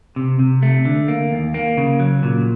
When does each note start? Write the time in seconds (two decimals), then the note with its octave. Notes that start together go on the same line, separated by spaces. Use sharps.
0.16 C3
0.39 C3
0.62 A3
0.85 D3
1.08 A#3
1.31 D#2
1.54 A#3
1.77 C#3
2.00 F#3
2.23 A#2